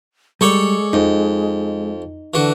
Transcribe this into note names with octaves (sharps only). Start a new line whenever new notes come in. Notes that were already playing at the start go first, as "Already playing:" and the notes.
G3 G#3 A4 C#5 D5
F2 D#4
D3 E3 F#4